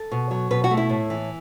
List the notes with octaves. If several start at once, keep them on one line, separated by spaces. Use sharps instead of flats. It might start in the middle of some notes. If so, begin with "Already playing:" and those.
Already playing: A4
B2
F#3
B2 B4
F#4
A3
E4
A2
E3